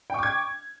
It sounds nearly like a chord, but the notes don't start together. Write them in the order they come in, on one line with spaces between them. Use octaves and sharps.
G5 C#6 D6 G#6